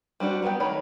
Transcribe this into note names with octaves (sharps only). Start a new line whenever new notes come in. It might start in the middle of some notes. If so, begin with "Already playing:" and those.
G3 C4 D4 F#4
F#3 G3 B3 G4 G5
D#3 A3 C#5 B5